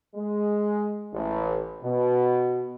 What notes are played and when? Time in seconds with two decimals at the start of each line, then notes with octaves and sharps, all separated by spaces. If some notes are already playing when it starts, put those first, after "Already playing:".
0.15 G#3
1.13 A1
1.83 B2